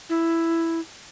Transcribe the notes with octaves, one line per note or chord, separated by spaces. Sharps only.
E4